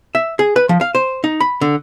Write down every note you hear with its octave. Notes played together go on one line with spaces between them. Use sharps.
E5
G#4
B4
F3
F5
C5
D#4
B5
D3